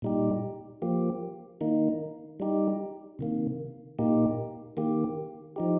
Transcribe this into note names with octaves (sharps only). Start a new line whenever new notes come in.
A#2 G3 D#4 G4
F3 A#3 G4
D#3 A#3 D#4
G3 D#4 G4
C3 D#3 A#3
A#2 A#3 D#4 G4
D#3 A#3 G4
F3 D#4 G4